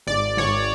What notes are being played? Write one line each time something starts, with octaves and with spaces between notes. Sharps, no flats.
G#1 D5
G#1 C#5